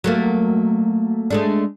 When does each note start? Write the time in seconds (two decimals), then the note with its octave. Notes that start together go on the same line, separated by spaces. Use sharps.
0.04 F#3 A3 A#3
1.30 G#3 A3 D4